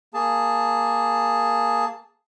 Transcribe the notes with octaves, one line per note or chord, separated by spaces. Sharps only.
A#3 G#4 A5